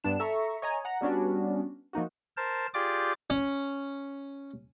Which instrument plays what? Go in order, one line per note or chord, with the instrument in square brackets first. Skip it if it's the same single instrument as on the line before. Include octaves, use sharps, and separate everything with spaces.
[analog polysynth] G2 B3 D4 E7
A4 E5 A#5 C#6
C#5 D#5 G#5 A#5
F#5 A#5
G3 B3 C#4 D4 F#4
F3 A#3 D#4 F#4
[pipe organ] A#4 C5 A5
F4 G4 G#4 D5 G5 D6
[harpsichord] C#4